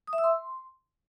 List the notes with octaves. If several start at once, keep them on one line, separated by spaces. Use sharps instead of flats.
D#6
E5
E6
C6